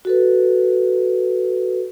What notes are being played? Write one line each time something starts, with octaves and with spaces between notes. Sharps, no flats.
F#4 A4 B4